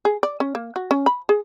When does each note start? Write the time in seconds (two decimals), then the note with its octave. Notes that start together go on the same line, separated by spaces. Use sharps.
0.05 G#4
0.23 D5
0.40 C#4
0.55 A#3
0.76 F#4
0.91 C#4
1.06 B5
1.29 G#4